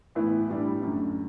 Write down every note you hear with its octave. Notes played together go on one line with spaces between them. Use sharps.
A2 E3 B3 E4
A2 G3 D4
F#2 D3 A3